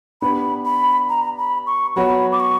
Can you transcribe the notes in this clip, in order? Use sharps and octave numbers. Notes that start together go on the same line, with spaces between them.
B3 D4 G4 B4 B5
B5
A#5
B5
C#6
F#3 B3 F#4 C#5 B5
D6
C#6